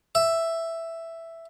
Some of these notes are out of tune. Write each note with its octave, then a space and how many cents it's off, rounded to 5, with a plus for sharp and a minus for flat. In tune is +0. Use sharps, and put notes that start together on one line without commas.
E5 +5